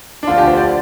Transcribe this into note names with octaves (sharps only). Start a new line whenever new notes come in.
D4
D2 D3 F3 F4
G4
C5
D5